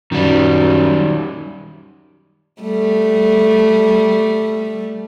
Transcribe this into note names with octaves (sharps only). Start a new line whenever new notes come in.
F#2 D#3 G3
G3 A3